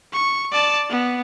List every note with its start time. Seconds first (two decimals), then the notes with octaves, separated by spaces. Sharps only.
0.13 C#6
0.52 D5 A5
0.90 B3